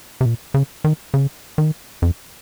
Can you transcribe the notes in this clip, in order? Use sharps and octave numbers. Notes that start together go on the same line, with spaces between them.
C3
A#2
C#3
D#3
C#3
D#3
F2